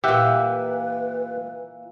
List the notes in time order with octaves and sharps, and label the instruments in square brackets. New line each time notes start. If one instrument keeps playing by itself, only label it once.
[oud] A#2 E3 [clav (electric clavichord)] G4 E5 F#5 [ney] B4